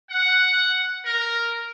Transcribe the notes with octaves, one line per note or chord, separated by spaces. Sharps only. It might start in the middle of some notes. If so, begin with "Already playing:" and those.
F#5
A#4